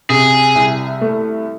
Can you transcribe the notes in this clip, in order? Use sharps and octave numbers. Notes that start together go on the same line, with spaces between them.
C3 G#4
C2
A3